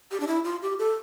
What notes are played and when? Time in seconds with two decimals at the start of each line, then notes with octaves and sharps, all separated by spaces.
0.11 G4
0.20 D4
0.27 E4
0.44 F4
0.62 G4
0.79 A4